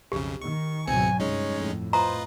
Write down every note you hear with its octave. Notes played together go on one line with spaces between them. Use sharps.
B1 F2 C#3 G4
D#3 C#6
G#1 C#2 B2 F#3 C4 G#5 C#7
G1 C2 G#3 C#4 D#4 C#5
F2 A2
F4 B4 C5 D#5 A#5